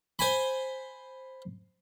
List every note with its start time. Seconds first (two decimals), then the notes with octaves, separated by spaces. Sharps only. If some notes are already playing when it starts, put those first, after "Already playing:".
0.19 C5 G#5 B5